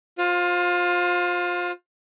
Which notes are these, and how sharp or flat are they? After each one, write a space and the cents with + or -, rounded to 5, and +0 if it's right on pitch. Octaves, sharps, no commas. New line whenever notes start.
F4 +25 C5 +0